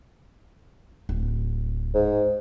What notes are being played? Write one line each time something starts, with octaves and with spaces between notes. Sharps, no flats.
D1
G#2